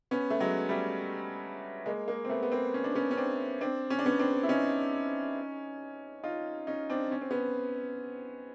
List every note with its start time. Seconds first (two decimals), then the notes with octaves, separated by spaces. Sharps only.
0.11 B3 C#4
0.30 A3
0.40 F#3 G#3
0.69 G3 A3
1.86 G#3 A#3
2.08 G#3 A#3
2.25 C4
2.29 A3 B3
2.43 B3
2.52 A#3 C4
2.74 C#4
2.84 D4
2.95 B3 C#4
3.11 C#4
3.17 C4 D4
3.61 C4 D4
3.90 C#4
3.99 D4
4.06 B3 C#4
4.19 C4 D4
4.43 E4
4.49 C#4 D#4
6.23 D#4 F4
6.67 C#4 D#4
6.90 C4 D4
7.11 C#4
7.21 C4
7.31 B3 C#4